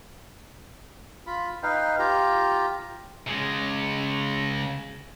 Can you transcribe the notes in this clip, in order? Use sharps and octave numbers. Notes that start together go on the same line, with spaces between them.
F4 B5
D#4 B4 F5 G5
F4 G4 A#5
C#3 G#3